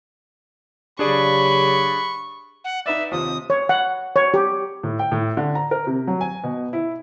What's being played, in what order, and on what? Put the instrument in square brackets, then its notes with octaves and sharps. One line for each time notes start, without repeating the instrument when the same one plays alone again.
[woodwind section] C#3 F#3 G4 [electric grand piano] D4 G#4 D5 [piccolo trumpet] B5 [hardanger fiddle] C#6
[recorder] F#5
[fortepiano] D#4 B4 D5 [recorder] E5
[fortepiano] D#2 C3 F3 [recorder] D#6
[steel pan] C#5
F#5
C#5
G4
[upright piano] A2
G5
A2
D3
A#5
A#4
C3
F#3
G#5
B2
E4